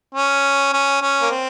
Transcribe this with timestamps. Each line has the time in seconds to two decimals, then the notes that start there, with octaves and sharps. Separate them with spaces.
0.15 C#4
0.73 C#4
1.02 C#4
1.21 A#3
1.30 C4